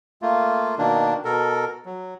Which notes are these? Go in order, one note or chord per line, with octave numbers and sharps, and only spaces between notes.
A3 A#3 F4
B2 D#3 A#3 D4
B2 A4 A#4
F#3